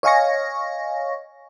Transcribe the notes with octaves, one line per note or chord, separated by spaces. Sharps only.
C#5 D#5 F5 G#5 C#6 A#6